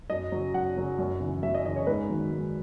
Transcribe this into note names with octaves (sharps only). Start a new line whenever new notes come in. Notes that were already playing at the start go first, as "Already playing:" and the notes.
F#2 D#5
C#3 F#3
F#2 F#5
C#3 F#3
F#2
C#3 E3
F#2 E5
D#5
C#3 E3 D#5
C#5
G#2 B4
D#3 F#3
G#2